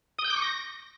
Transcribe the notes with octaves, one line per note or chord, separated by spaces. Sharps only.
D#6
G6
D6
C#6
A#6